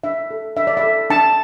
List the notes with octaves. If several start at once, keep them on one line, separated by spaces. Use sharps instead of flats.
D4 E5
A4
D4 E5
D5
E5
A4
D4 A5